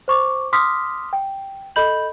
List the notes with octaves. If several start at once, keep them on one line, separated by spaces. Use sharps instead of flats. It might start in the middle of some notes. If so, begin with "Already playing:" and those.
C5 C#6 D6
C6 D6 D#6 F6 B6
G5
A4 D#5 B5 G6 F#7